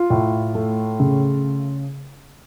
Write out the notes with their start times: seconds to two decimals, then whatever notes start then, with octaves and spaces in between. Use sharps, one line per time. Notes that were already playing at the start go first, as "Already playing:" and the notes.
Already playing: F4
0.10 A2
0.55 A3
1.00 C#3